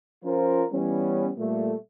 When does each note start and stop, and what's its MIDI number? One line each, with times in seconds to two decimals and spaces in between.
0.24 0.64 53
0.24 0.64 61
0.24 0.64 65
0.24 0.64 70
0.24 0.64 72
0.72 1.30 52
0.72 1.30 55
0.72 1.30 59
0.72 1.30 61
1.38 1.76 46
1.38 1.76 55
1.38 1.76 57